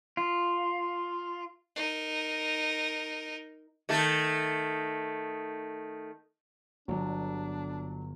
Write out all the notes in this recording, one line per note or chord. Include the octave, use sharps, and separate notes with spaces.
F4
D#4 A#4
D#3 A3 A4
G1 F#3 D4